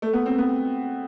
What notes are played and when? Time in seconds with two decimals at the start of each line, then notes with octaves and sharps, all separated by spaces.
0.02 A3
0.13 B3
0.26 C4
0.38 B3